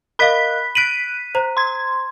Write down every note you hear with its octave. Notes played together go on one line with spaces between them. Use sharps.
A#4 D#5 F5 B5 F#6 B6
F#6 B6 D7 D#7 F#7
C5 A#5
C6 G#6